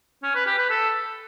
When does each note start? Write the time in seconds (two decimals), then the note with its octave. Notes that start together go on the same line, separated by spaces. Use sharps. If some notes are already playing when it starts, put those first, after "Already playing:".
0.23 C#4
0.35 B4
0.47 G4
0.58 B4
0.70 A4